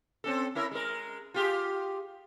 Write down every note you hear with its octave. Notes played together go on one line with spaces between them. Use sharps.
C4 C#4 A4
C#4 E4 A#4
G#3 A#4
F4 G4 G#4